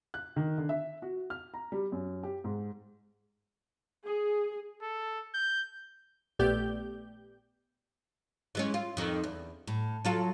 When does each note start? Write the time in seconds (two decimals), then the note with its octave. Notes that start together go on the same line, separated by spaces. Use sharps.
0.14 F#6
0.36 D#3
0.58 D3
0.69 E5
1.02 F#4
1.30 F6
1.54 A#5
1.72 G3
1.92 F#2
2.23 G4
2.44 G#2
4.05 G#4
4.82 A4
5.34 G6
6.39 A#1 A3 B3 G4 D5 G6
8.55 E3 G#3 C#4
8.74 F4
8.97 F2 D#3
9.23 E2
9.67 A2
10.05 F#3 F4 A4